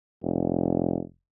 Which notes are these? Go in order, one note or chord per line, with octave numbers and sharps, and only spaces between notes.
F1